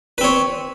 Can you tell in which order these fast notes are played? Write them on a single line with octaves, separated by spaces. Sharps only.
B4 C4 C#5